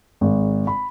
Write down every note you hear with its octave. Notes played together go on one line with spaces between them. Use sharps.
G#1
B5